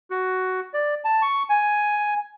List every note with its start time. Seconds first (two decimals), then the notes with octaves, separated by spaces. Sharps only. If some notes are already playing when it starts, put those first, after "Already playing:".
0.11 F#4
0.74 D5
1.05 A5
1.22 C#6
1.49 G#5